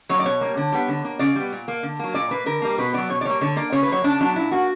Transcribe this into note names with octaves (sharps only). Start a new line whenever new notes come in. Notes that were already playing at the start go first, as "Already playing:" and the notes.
F#3 A#3 C#5
D5
B2 C#5
G3 A#3
D3
G3 B3
D3
A#3
C#3 D5
G3 B3
A#2
A#3
D3
F#3 A#3
A#2 D5
A#3 B4
D3 A#4
G3 A#3
B2 B4
F#3 B3 D5
B2 C#5
D5
G3 A#3 C#5
D3 C#5
A#3 D5
C#3 C#5
B4
F#3 A#3 C#5
C#3 D4
F#3 B3 D4
A#2 E4
A#3 F#4